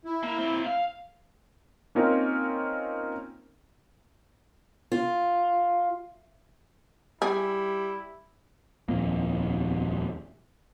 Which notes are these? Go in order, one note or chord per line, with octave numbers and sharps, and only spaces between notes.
E4
A#3
A#3 C4
F5
A#3 C4 C#4 D#4 F4 A#4
F4
G3 E4 G#4
D#1 F2 A#2 A#3